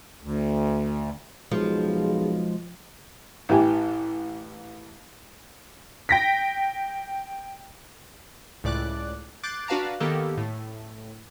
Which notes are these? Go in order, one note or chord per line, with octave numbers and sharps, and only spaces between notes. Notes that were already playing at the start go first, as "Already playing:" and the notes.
D2
B1 F3 G#3 G#4
A1 E3 G4 G#5
G5 A#6 B6
C#2 A2 D5 D6 F#6
D6 F#6 G6 A6 C7 D7
D4 F#4 B4 F5 A5 A#5
D#3 A#3 B3 G4 A4
A2